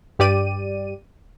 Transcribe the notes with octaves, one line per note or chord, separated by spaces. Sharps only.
G2 G4 D5 D#7